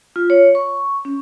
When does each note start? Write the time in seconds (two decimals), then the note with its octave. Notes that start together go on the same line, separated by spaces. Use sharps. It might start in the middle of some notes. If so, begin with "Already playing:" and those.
0.16 F4
0.30 C#5
0.55 C#6
1.05 C#4